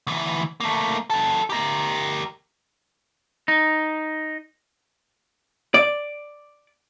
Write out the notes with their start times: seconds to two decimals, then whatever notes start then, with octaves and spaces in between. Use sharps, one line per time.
0.07 D2 E3
0.60 A3 A#3
1.10 F#3 A4
1.50 G4 A#4
3.48 D#4
5.74 D5